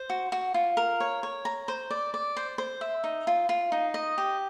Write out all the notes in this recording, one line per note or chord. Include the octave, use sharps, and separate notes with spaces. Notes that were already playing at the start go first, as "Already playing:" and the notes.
Already playing: C5
F#4
F#4
F4
A#4
C#5
C#5
A#5
C5
D5
D5
C5
C5
E5
D#4
F4
F4
D#4
D#5
G4